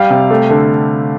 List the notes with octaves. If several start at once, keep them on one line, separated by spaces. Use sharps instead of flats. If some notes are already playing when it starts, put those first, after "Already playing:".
Already playing: G3 F5
C3
A3
D3